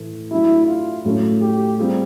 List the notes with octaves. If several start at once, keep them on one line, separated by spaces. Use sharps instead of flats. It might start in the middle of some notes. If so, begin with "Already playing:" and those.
Already playing: A2 E3 A3
F#3 A3 D4 E4 G4
F4
A2 F#3 A3 C#4
G4
G3 C4 F4 G#4